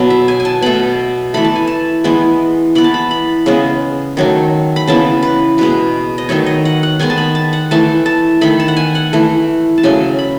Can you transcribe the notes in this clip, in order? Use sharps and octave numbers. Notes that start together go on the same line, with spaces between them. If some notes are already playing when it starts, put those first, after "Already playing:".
Already playing: B2 F#3 B3 A5 B5
E5
G#5
G#5
A5
B2 A3 B5
E3 A3 B5
A5
G#5
A5
E3 G#3 B3
E3 B3 B5
A5
B5
B5
C#3 G#3 B3
D#3 F#3 A3
B5
C#3 E3 B3 A5
B4
B2 G#3 B3 B4
D#5
D#3 F#3 A3 C#5
D#5
F#5
F#5
D#3 G#3 B3 G#5
A5
B5
A5
F#5
E3 A3 A5
A5
D#3 A3 B5
A5
F#5
G#5
F#5
E3 A3
A5
C#3 F#3 A3 G#5
B5